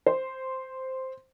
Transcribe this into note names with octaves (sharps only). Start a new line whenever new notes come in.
C5